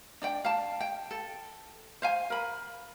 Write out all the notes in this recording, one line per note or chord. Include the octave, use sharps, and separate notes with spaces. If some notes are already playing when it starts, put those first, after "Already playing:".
D4 D5 G5
F5 A5
G5
A4
C5 F5 G#5
A#4 B5